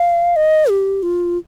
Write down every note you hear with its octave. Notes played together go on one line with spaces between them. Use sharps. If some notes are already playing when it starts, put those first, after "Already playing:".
Already playing: F5
D#5
G4
F4